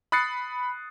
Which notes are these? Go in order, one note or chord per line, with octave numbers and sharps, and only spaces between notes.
B5 D#6 F#6 A6 C7 C#7